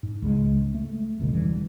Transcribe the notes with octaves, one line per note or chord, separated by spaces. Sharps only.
G#2
C#2 C#3 G#3
A3
G1 C#2 B2 D3
E1 E3 G3